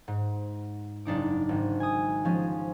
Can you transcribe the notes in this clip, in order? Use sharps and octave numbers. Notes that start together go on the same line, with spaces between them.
G#2
F#1 D4 D#4 D6
G#1
G#5 D#6
F3 G#3 C#4